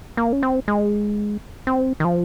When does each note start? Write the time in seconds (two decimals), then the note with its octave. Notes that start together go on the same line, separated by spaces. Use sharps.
0.17 A#3
0.32 C#4
0.43 C4
0.68 G#3
1.67 C4
2.00 D#3
2.05 F3